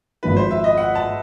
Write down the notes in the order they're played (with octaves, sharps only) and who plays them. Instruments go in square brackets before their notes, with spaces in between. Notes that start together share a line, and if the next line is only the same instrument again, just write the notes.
[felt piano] G#1 G#2 F3 [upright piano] B4
[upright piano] C5
E5
D#5
F#5
A5